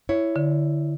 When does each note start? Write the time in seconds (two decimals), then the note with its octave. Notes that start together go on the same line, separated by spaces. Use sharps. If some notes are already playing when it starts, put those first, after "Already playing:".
0.09 E4 C#5
0.36 D3